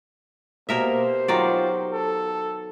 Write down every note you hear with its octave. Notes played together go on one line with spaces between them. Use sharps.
B2 A#3 G4 A#4 C5 E5
D#3 F#3 F4 D5
A4